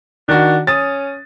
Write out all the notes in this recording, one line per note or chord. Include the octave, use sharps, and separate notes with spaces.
D#3 D4 F#4
C#4 D#6 A6